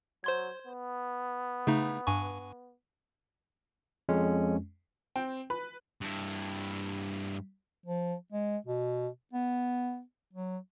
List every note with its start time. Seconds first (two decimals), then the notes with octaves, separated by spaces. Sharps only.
0.24 F#3 C5 C6 G#6
0.67 B3
1.67 C#3 A3 D#4
2.07 G2 G#5 C#6
4.09 F2 G#3 C#4
5.16 C4 G5
5.50 B4 B5
6.01 G2 E4
7.86 F3
8.32 G#3
8.67 B2
9.33 B3
10.33 F#3